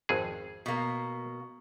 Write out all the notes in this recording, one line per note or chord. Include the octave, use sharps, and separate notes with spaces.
G#1 F2 G#4
B2 A#3